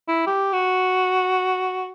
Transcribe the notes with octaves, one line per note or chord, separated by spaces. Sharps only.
E4
G4
F#4